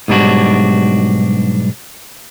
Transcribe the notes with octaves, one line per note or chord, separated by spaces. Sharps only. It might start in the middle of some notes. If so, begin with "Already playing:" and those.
B1 G#2 G3 D4 F#4